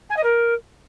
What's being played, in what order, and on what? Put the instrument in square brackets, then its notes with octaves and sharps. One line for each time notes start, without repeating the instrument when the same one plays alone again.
[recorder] G#5
D#5
A#4